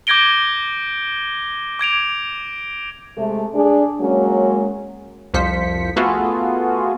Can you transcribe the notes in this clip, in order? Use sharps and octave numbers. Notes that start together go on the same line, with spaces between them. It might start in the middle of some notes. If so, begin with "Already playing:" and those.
D6 G6 G#6 A#6 D7 G7
D6 G#6 D7 F7
C3 G#3 A3
D4 G#4
F#3 G#3 A#3 C#4
C2 F2 F3 C5 B6 C#7
A3 B3 F4 F#4 G#4 A4